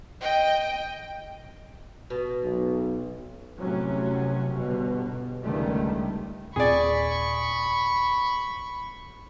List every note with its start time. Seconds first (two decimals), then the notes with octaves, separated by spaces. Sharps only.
0.21 D#5 G5
2.10 B2
2.43 B1
3.58 F1 A2 C3 F#3 C#4
4.56 G1 B2
5.42 C#2 G2 D3 D#3 A3
6.56 D#2 A#2 C4 G#4 D5 B5 C#6